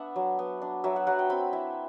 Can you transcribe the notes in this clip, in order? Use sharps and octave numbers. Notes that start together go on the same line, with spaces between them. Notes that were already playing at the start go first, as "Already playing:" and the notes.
Already playing: B3 D4 D5 E5 F#5
F#3
B3
D4
F#3 E5
F#5
F#3 F#5
G5
C4 B5
E4 E5